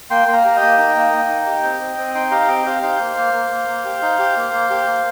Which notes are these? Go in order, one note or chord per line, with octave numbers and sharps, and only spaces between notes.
A#3 G5 C6
A#3 C6
F5 A#5
G4 A#5
D#5 G5
A#3
D#4
A#3
A#3
D#4
G4
C4
C4
C4
D#4 G5 C6
G4 F5 A#5
C4 D#5 G5
G4 C5 F5
D#4 C5 F5
A#3
A#3
A#3
A#3
A#3
G4
D#4
G4
A#3
A#3
G4
A#3